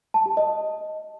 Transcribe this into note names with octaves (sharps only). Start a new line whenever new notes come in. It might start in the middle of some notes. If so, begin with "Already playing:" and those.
A5
G4
D#5